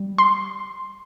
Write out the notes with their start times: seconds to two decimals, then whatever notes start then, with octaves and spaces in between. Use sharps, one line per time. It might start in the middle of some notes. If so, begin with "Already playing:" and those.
Already playing: G3
0.18 C6